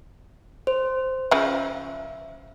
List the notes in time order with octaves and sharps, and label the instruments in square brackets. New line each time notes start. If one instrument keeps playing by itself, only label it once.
[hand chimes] C5
[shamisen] C#3 F3 [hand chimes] E5